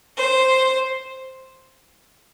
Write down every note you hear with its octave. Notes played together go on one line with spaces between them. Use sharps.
C5